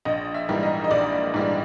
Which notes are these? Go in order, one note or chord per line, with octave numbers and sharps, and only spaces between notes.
A#1 D#5
E5
G#2 E3 G3 A#3
D#5
D#5
A#1 D5
G#2 E3 G3 A#3